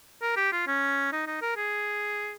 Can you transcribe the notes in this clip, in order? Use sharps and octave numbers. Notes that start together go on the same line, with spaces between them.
A#4
G4
F4
C#4
D#4
D#4
A#4
G#4